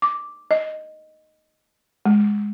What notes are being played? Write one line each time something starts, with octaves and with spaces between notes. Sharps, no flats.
D6
D#5
G#3